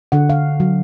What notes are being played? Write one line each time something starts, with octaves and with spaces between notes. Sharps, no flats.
D3 F#5
F5
F#3